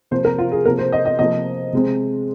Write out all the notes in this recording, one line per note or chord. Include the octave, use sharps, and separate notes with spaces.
C3 F3 A#3 C5
A#4
F4
G#4
C3 F3 A#3 A#4
C5
D#5
D#5
C3 F3 A#3 D#5
C3 G#3 C4